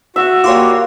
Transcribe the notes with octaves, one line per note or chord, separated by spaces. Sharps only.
F#4 E5
G3 A#3 F4 C#5 C6 D6